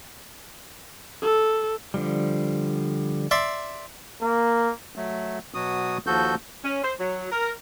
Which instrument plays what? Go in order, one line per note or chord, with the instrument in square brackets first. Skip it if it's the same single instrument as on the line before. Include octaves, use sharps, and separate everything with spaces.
[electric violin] A4
[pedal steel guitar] D3 F3 G3
[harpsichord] D5 E5 C6
[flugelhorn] A#3
[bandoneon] F#3 A3
B2 F#3 F#4 D#6
D#2 F3 F#4 A4 G6
[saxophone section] C#4
C5
F#3
A#4